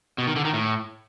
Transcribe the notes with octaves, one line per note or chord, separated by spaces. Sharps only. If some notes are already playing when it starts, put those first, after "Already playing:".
B2
D#3
D3
D#3
A2